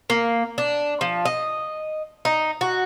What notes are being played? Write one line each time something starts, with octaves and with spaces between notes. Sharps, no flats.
A#3
D4
F3
D#5
D#4
F#4